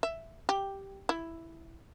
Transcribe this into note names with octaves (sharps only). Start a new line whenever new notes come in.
E5
G4
E4